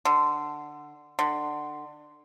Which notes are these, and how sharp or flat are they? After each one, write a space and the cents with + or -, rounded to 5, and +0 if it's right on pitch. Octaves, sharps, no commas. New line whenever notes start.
D3 +15
D3 +25